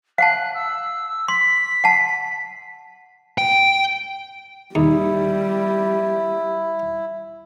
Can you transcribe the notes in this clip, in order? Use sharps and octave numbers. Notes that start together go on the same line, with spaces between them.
F5 F#5 A5 F#6
E6
C6 B6
F#5 A5
G5
D#2 G3 E4